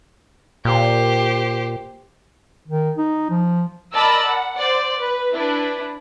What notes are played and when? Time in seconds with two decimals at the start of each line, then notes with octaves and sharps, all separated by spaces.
0.65 A#2 G4 C5
2.68 D#3
2.97 D#4
3.30 F3
3.94 A#4 D5 D#5 A5 B5 E6
4.26 F#5
4.58 C5 D5
4.99 B4
5.33 D4 E4 B4